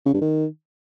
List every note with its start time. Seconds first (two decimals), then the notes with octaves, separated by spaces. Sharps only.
0.06 C#3
0.13 G2
0.21 D#3